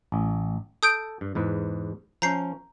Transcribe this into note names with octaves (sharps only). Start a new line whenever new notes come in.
A1
A4 D#6 G6 D7
G2
E2 G#2 B4
F3 C#4 A#5 G6 C7